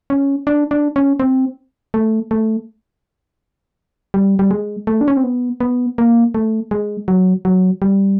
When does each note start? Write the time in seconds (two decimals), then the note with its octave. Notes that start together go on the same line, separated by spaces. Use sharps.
0.10 C#4
0.47 D4
0.71 D4
0.96 C#4
1.20 C4
1.94 A3
2.31 A3
4.14 G3
4.39 G3
4.51 G#3
4.87 A3
5.01 D4
5.08 C#4
5.17 C4
5.24 B3
5.61 B3
5.98 A#3
6.35 A3
6.71 G#3
7.08 F#3
7.45 F#3
7.82 G3